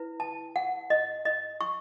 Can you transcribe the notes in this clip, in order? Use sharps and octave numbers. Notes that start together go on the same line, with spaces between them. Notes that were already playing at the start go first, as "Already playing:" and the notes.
Already playing: E4 B4
A5
F#5
D#5
D#5
C#6